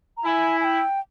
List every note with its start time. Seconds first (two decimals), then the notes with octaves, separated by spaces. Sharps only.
0.17 A#5
0.25 E4 G#5
0.61 G#5
0.64 G5